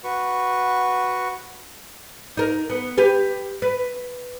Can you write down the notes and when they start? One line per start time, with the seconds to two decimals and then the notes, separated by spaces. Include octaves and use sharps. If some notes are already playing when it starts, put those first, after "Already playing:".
0.04 F#4 B4 C#6
2.37 D#4 A#4
2.70 B3
2.98 G4 B4
3.62 B4